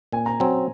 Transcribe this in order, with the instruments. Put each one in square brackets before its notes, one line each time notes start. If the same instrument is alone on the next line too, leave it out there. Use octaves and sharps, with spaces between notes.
[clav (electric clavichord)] A#2 [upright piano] G#5
[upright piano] A#5
[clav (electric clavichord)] F#3 C4 [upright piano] G#5